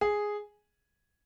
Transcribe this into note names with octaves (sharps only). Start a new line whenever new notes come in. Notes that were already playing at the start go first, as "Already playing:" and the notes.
G#4